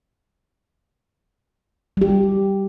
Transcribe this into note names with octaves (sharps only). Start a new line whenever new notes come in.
G3 G4